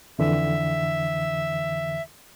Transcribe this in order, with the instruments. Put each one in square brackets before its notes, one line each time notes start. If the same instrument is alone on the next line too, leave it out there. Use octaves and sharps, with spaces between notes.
[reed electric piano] F2 D3 E3 [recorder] E5